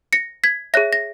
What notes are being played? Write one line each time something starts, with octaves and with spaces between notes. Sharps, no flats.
A#6 C#7
G#6 B6
G#4 C#5 E5 F#6 A#6
A#6